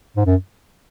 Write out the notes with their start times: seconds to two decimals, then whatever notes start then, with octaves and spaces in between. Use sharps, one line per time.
0.17 G#2
0.26 F#2